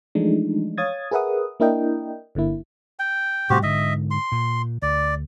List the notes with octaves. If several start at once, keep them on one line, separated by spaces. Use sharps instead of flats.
E3 F3 G#3 A3 D4 D#4
C#5 F5 D#6 G#6 A6
G#4 A#4 B4 E5 F#5 D#6
A#3 D4 E4 A#4 D#5 G5
G1 D3 A#3 E4
G5
A2 C3 G3 C4 F#4 G4
G#2 D3 D#5 E5
C6
A#2
D2 D5